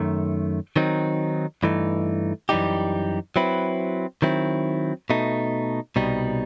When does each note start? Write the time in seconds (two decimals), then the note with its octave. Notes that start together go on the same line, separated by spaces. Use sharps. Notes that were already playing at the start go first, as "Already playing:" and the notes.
Already playing: F#2 D#3 A3
0.76 D#3 F#3 C4 D#4
1.63 G2 E3 A3 D#4
2.49 F#2 E3 G3 D#4 G4
3.36 F#3 C4 E4 B4
4.22 D#3 F#3 C4 E4
5.10 B2 A3 D#4
5.96 C2 B2 G3 D#4